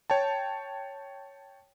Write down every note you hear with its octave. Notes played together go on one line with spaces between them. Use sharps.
C#5 G5 A5